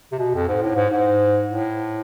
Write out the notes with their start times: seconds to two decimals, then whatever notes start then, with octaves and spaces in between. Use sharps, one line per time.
0.12 C3
0.19 B2
0.34 F2
0.48 G#2
0.62 A2
0.75 G#2
0.90 G#2
1.48 A2